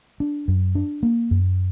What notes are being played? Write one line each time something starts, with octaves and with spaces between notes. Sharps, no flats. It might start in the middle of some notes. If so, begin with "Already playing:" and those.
D4
F#2
D4
A#3
F#2